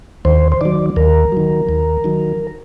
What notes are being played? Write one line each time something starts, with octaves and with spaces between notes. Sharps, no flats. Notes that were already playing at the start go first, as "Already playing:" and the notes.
D#2 C5
C5
D#3 F#3 D5
D#2 A#4
D#3 F#3
D#2
D#3 F#3